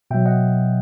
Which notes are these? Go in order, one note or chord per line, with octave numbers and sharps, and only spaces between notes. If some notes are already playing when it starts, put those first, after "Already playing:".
B2 F#3 E5 G5
D#5 F#5